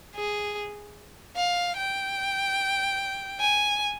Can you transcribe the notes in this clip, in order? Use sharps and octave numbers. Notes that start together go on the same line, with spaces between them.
G#4
F5
G5
G#5